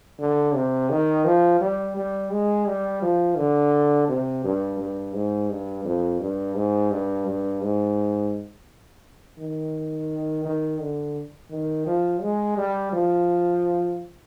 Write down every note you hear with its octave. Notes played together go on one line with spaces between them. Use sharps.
D3
C3
D#3
F3
G3
G3
G#3
G3
F3
D3
C3
G2
G2
G#2
G2
F2
G2
G#2
G2
G2
G#2
D#3
D#3
D3
D#3
F3
G#3
G3
F3